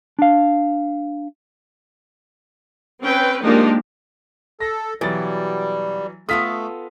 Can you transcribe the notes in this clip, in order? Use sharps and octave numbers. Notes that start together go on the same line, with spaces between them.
D4 F5
C4 C#4 B4 G5
F3 G#3 A#3 D4 D#4 G4
A4 A#6
B2 E3 F#3 G3 A6
A3 B3 F4 A4 D#6 F6 B6